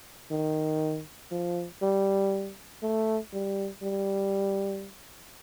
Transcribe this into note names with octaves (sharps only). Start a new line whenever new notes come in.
D#3
F3
G3
A3
G3
G3